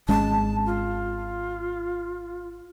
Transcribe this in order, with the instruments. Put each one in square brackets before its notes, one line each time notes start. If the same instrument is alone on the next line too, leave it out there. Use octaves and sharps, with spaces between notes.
[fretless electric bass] G#1 G#3 C#4 [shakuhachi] A5
[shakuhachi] F4